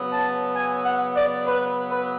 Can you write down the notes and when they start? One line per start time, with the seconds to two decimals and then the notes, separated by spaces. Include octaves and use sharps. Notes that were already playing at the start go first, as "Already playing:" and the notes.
Already playing: C#3 F#3 B3
0.11 A5
0.55 G#5
0.85 F#5
1.14 D5
1.45 B4
1.88 B4